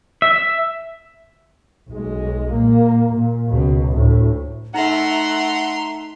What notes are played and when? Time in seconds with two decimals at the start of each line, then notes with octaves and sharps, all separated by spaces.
0.22 E5
1.90 B1 G#3
2.51 A#2 A#3
3.13 A#2
3.48 C#2 B2
3.92 D2 A2
4.74 A3 D#4 E5 F#5 A#5 C6